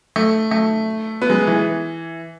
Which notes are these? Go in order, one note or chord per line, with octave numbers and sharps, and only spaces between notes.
A3
A3
B3
G#3
E3